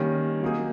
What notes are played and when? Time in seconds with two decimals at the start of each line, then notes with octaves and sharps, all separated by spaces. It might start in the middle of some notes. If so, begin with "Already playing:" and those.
Already playing: D#3 G3 A#3 C#4
0.42 F#3 A#3 D#4 G#4